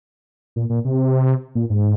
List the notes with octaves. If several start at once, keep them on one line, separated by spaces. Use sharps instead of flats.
A#2
A#2
C3
A#2
G#2